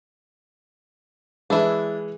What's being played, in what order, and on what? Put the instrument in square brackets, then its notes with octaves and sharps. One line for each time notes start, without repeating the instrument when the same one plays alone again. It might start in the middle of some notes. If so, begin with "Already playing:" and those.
[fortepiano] E3 G#3 [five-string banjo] D4 E4